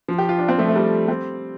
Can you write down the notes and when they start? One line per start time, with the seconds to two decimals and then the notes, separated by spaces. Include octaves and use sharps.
0.08 F3
0.18 G4
0.29 F4
0.38 D4
0.49 C4
0.58 F3 A3
0.68 A3
0.76 G3
1.08 G3 C4